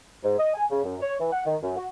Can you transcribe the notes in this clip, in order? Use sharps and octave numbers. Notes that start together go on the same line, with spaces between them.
G#2
D#5
G#5
C#3
F#2
C#5
E3
F#5
D#3
F#2
F#4